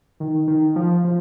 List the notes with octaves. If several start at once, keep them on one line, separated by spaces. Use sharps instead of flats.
D#3
D#3
F3
F3